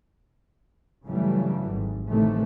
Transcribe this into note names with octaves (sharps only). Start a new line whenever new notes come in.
G2 C#3 E3 F#3 G3 A3
G#1 G#2
A2 C3 D#3 E3 A3